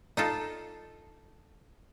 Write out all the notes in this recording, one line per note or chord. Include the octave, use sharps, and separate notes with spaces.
D#4 F4 A4